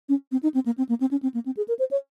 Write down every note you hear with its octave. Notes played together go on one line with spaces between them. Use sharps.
C#4
C4
D#4
C4
A#3
C4
A#3
C4
C#4
C4
A#3
C4
G#4
A#4
C5
C#5